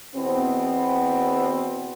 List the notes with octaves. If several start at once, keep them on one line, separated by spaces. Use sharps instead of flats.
E2 B2 B3 C4